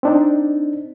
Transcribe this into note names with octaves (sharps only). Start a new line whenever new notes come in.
C4 D4 D#4